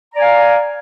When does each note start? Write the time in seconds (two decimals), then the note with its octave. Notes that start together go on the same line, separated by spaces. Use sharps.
0.13 A#5
0.16 D5
0.18 G#5
0.21 F5